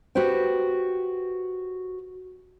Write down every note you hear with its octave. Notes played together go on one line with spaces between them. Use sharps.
F#4 G4 B4 C5 G5